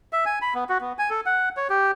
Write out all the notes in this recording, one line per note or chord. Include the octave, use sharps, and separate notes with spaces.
E5
G#5
B5
B3
F#4
B3
G#5
A4
F#5
C#5
G4